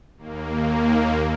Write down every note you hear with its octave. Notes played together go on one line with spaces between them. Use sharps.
D#2 A#3